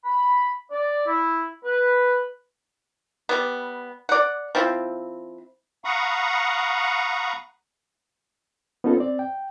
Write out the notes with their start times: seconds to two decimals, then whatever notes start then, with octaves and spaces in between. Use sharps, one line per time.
0.05 B5
0.72 D5
1.07 E4
1.65 B4
3.29 G3 B3
4.09 D5 F#5
4.55 F3 C4 E4
5.85 F5 F#5 A#5 B5 C#6 D#6
8.84 B3 C#4 D#4 F4 A4
8.97 C4 D5
9.19 G5